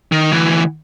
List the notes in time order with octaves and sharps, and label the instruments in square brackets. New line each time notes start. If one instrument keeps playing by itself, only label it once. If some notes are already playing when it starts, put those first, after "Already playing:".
[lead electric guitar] D#3
D2 E3